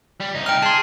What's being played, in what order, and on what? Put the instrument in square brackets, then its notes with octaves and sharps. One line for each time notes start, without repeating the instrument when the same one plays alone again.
[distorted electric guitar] G3
C2 D#4
[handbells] G5 F6
[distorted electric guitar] G#4 [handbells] A5 C6